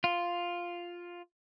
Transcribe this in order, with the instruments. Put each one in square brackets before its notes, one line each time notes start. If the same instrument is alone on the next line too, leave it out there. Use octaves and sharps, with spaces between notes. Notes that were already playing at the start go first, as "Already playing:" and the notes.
[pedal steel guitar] F4